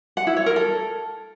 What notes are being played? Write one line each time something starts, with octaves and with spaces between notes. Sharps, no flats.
F#5
E4
C#5
A#4
A4